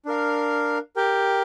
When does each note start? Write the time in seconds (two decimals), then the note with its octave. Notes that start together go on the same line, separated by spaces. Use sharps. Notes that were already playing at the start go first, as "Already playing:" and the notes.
0.05 D4 A#4 F5
0.96 G4 A#4 G5